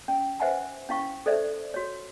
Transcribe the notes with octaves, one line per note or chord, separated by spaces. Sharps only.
C#4
B4 C5 E5 F#5 G#5 A#5
C#4 E4 F5 C#6
A4 C5 D5 E5
F#4 C#5